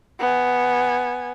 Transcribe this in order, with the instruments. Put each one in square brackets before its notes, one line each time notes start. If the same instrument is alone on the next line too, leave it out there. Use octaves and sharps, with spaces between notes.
[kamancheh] B3 G#5